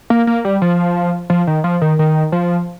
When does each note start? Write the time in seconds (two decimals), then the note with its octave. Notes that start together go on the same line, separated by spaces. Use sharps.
0.10 A#3
0.27 A#3
0.45 G3
0.62 F3
1.30 F3
1.47 D#3
1.64 F3
1.82 D#3
1.99 D#3
2.32 F3